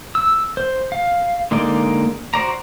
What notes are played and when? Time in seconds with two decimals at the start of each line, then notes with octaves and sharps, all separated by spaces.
0.15 E6
0.57 C5
0.92 F5
1.51 D3 G#3 A#3 D#4 D5
2.34 F#4 C5 D5 A#5